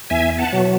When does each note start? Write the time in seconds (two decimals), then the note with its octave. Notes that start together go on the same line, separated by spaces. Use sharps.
0.10 E2 E5 G#5
0.38 F#5 A5
0.52 B2 F#3